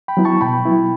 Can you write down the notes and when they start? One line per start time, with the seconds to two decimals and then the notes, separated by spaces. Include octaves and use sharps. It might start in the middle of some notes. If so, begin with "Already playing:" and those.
0.08 G5 B5
0.17 F#3 B3 E4
0.25 A5 C#6
0.41 B2 G5 B5
0.65 F#3 B3 E4